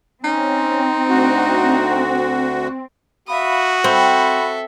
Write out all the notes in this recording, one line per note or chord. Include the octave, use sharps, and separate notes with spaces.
C4 C#4 D#4
D2 F#4
F#4 E5 F5 B5 D#6
C4 A4 E5 B5